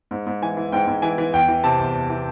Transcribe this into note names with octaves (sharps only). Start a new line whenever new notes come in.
G#2
G#2
E3 G#5
E3
G#2 G5
G#2
E3 G#5
E3
E2 G5
E3
C3 A5
E2
E2
E3